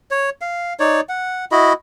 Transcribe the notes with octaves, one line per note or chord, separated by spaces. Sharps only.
C#5
F5
D#4 C#5 D5
F#5
E4 F#4 D#5 B5